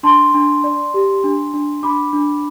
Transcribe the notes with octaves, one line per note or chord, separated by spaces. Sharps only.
D4 A5 C6
D4
D5
G4
D4
D4
D4 B5 D6
D4